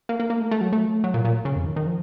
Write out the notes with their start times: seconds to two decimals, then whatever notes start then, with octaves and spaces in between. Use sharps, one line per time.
0.09 A#3
0.20 A#3
0.30 A#3
0.41 A3
0.51 A3
0.61 F#3
0.73 A3
1.04 F#3
1.14 A#2
1.25 A#2
1.45 C#3
1.56 F2
1.66 D#3
1.76 D#3
1.86 F3